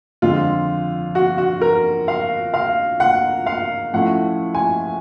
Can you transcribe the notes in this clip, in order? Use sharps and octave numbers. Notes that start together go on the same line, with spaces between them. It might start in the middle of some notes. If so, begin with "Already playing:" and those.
F2 D3 F3 G#3 F4
F#4
F#4
A#4
F5
F5
F#5
F5
A2 F3 A3 C#4 F#5
G#5